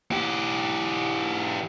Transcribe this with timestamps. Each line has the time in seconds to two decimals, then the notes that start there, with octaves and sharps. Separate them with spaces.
0.11 E3 G4